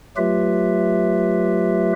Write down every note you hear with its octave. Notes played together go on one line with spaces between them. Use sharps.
F#3 A3 F4 G4 B4 E5